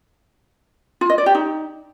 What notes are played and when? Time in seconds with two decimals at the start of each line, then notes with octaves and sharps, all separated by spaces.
1.01 F4
1.10 D#5
1.18 D5
1.26 G4
1.35 D#4